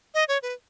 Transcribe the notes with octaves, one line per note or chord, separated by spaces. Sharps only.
D#5
C#5
B4